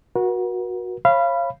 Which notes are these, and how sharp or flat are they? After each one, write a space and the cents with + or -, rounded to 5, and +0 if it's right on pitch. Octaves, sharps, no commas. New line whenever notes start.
F#4 -15 A#4 +45
C#5 -35 F5 -25 B5 +0